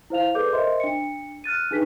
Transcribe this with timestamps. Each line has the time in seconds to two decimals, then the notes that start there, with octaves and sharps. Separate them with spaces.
0.10 E4 C5 F5 F7
0.34 G#4 A4 B4 D5 D6 G6
0.53 A#4 C5 D#5 E5 C6
0.80 D4 C#7
1.44 F6 F#6 A6 D#7
1.71 D4 D#4 G#4 B4 B6